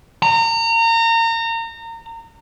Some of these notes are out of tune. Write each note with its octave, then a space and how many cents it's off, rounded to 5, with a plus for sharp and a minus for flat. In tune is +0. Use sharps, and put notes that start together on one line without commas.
A#5 -30